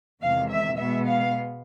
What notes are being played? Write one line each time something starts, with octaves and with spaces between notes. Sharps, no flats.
E2 C3 D#3 G#3 F5
E5
B2 G#3 B3 E5
F5